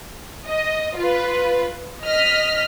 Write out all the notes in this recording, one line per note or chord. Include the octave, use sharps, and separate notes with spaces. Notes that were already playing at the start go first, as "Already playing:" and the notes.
D#5
F4 B4
D#5 F6 B6